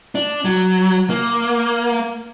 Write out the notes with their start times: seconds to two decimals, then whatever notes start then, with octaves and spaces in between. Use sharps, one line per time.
0.15 D4
0.45 F#3
1.10 A#3